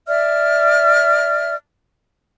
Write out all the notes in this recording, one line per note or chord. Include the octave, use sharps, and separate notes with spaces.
D5 E5 F6